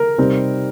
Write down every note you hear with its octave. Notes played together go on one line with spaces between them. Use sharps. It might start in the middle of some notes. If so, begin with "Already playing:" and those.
Already playing: A#4
C3 G3 C4 D#4